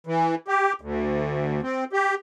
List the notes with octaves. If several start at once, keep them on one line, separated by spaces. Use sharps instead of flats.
E3
G4
D2
C4
G4